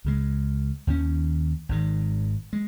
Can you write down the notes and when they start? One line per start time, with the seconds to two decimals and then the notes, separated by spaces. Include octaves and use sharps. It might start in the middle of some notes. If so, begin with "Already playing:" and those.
0.05 C#2 C#3 G#3
0.87 D#2 D#3 C#4
1.69 G#1 G#2 D#3
2.53 G#3